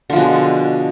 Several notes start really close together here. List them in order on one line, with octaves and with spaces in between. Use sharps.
D3 F3 B2 G#3